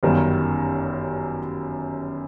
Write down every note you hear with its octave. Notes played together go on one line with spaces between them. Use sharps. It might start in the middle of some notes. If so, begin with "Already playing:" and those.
G1 F#2 D#3 G3